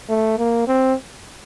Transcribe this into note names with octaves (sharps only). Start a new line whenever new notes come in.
A3
A#3
C4